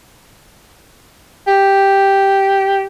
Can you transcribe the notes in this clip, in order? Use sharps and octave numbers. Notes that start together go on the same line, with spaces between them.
G4